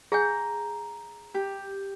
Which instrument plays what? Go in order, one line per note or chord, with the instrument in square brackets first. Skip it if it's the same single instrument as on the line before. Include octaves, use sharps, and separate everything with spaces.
[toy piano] G#4 F#5 G#5 [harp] A#5 G6
[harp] G4